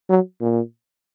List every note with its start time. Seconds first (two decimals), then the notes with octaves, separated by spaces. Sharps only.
0.09 F#3
0.41 A#2